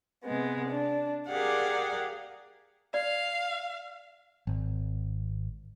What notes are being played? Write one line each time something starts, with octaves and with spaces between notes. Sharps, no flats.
C3 G#3 B3
D4
G4 G#4 A#4 D5 F5 F#5
D5 F5
G#1